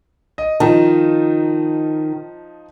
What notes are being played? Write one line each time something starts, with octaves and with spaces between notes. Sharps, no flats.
D#5
D#3 F3 D#4 A5